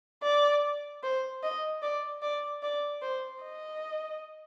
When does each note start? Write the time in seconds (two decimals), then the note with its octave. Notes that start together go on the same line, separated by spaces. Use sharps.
0.23 D5
1.03 C5
1.43 D#5
1.83 D5
2.22 D5
2.63 D5
3.02 C5
3.42 D#5